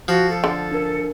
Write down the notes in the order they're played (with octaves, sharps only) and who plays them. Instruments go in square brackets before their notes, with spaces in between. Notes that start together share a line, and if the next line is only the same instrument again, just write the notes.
[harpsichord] F3 [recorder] F#4
[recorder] A4
[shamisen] D3
[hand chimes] D4 A#4